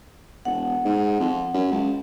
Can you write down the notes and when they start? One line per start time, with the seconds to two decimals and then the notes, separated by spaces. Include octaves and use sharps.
0.45 E1 F#5
0.85 G#2
1.20 F2
1.54 F#2
1.71 C#2